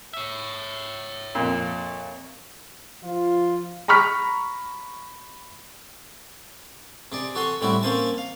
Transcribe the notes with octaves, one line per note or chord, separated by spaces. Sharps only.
C#5 E5
F2 A#2
F3 F4
A#5 B5 C#6 F6 B6
C3 G#4 D5
F#4 A4 C#5 G#5 C6
A2 G3 C4 E4 F#4
A#3 C4 C#4 C5 G#5 A5
F5